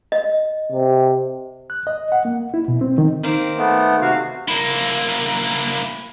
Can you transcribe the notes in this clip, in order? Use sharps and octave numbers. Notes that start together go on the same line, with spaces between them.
D#5
C3
F#6
D#5
F#5
A#3
E4
B2
C4
D#3
D#3 A#3 C4
A3 B3
C3 F#4 F5
A#3 E4